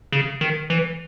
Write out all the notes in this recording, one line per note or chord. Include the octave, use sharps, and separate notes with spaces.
C#3
D#3
E3